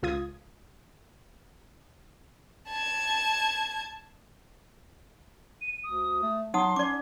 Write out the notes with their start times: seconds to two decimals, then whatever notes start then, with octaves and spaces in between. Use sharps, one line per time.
0.03 C#2 F4 D#6 G#6
2.68 A5 G#6
5.61 D#7
5.84 D2 D#6
6.22 A3
6.54 F#3 D#4 F#5 C6 D#6
6.76 C#4 D5 D6